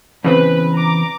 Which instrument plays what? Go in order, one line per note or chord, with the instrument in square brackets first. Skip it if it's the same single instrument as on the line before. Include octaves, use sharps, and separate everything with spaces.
[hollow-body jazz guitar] E2 C#3 C4 [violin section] B4
[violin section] A#5 D6